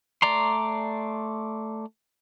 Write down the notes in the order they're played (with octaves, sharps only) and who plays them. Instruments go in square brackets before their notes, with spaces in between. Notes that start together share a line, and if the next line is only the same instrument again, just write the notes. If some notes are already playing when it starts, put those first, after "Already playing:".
[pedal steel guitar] A3 D5 A#5 C6